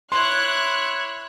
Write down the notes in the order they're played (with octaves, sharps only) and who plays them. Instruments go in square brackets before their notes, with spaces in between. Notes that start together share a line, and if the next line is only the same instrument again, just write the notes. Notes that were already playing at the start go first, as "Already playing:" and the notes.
[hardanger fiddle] E4 C#5 [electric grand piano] C6 [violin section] F#6